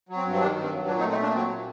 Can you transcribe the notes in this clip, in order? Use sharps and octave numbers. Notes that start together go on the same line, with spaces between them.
F#3
C4
G2
C4
D#3 D4
G2
C4
F#3
A#2 D4
C4 D#4
A3
C4 D#4
A#2 D4
F#3 C4
A#2